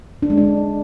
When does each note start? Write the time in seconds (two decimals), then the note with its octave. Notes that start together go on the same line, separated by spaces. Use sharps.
0.22 D4
0.30 G#3
0.38 D4